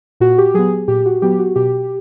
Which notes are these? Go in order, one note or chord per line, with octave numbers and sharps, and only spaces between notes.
A#2 F#4
G4
F#3 B3 G#4
A#2 G4
F#4
F#3 B3 G4
F#4
B2 G4